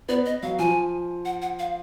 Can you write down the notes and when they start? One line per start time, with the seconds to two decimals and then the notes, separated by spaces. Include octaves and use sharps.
0.09 B3 D5
0.26 D#5
0.43 F#3 F5
0.59 F3 G#5
1.25 F#5
1.42 F#5
1.59 F5